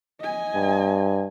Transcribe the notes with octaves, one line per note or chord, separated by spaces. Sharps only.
D#5 G#5
G2